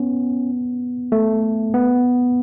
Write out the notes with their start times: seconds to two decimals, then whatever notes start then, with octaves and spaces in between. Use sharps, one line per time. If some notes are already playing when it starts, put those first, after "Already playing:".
Already playing: B3 C#4
1.12 A3
1.74 B3